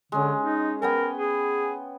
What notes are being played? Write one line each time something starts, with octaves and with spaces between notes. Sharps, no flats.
D3 G#3 C#4
D#4
B3 A#4 G5 G#5
G#4